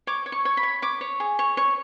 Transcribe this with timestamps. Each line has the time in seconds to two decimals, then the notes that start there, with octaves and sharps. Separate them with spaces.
0.07 C#5 D6
0.26 C#5
0.32 C#6
0.45 C#5
0.57 B5
0.63 C#5
0.82 C#5 D6
1.01 C#5
1.20 G#4
1.39 C#5
1.57 C#5